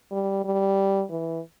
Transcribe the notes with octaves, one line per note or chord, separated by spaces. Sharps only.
G3
G3
E3